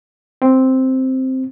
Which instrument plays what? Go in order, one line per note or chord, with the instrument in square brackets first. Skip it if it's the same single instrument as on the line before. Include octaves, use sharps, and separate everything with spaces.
[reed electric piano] C4